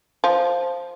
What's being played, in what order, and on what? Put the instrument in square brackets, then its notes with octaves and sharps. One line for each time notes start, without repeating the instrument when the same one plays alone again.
[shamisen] F3